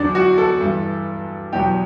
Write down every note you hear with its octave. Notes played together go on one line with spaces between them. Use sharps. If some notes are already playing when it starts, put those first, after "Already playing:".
Already playing: E2 D3 F#3 D4
F#4
A4
G2 E3
E2 B2 F#3 G4